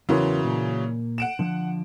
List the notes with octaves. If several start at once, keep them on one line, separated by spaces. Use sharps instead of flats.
E2 C#3 E3 F#3 A#4 C6
A#2 A#3
F#5 D7 E7
D3 F3